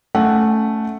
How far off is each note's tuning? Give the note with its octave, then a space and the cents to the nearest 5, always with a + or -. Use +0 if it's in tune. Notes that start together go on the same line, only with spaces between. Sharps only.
A3 +0 C#4 +10 F#5 +0